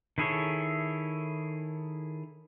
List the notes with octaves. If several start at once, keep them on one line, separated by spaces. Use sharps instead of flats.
D#3 E4 G#4 A4 C#5